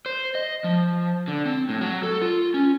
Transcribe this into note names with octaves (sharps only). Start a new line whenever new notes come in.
C5
D#5
F3
D3
C4
A2
F#3
A4
F4
C#4